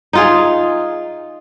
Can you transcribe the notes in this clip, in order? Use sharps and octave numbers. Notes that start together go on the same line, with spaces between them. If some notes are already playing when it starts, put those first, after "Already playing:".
D#4 F4 G#4